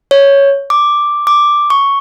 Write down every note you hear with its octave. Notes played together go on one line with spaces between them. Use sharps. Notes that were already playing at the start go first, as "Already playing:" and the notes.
C#5
D6
D6
C#6